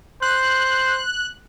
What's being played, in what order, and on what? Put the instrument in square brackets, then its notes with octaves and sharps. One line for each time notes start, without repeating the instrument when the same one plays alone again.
[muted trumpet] C5 [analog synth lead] F#6